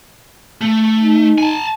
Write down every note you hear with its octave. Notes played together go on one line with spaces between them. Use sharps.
A3
D#4
G#5 A5